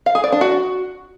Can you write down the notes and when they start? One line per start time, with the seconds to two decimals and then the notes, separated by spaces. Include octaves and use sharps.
0.06 F5
0.15 G#4
0.24 D5
0.32 D4
0.41 F#4